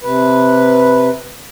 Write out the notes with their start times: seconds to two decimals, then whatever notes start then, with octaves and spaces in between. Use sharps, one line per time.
0.01 C3 B4